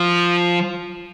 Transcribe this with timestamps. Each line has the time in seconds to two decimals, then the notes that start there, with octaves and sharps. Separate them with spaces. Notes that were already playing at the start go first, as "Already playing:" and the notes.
Already playing: F3